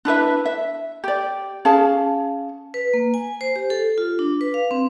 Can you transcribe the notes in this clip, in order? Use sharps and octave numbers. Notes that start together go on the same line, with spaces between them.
D4 E4 B4 E5
E5
G4 D5
C#4 G#4 F5 A5
B4
A#3
G#5
C5
G4
A4
F4
D4
B4
F5
C4